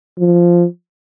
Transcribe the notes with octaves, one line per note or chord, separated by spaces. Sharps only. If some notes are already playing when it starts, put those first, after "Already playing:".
F3